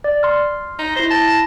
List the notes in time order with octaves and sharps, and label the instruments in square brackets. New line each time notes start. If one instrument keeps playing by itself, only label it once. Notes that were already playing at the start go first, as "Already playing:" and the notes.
[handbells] D5
C6 F6
[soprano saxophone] D#4
[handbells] E4 A#6 [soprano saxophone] C5
[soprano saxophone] A5